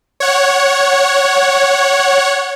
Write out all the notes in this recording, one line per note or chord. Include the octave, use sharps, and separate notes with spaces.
C#5 F#5